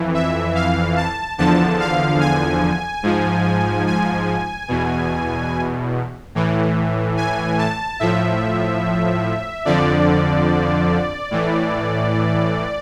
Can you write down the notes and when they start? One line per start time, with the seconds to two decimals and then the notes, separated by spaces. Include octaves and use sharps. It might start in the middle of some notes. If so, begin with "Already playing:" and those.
Already playing: F2 E3
0.14 E5
0.55 F5
0.97 A5
1.38 E2 D3 F3 A5
1.80 F5
2.20 G#5
3.03 G#2 F3
3.87 G#5
4.68 E2 B2
6.35 A2 E3
7.17 G#5
7.58 A5
8.00 A2 F3 E5
9.65 F2 D3 F3 D5
11.31 A2 E3